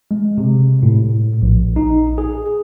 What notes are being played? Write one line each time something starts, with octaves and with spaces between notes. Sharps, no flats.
G#3
C3
A2
A#1
D#4
G#4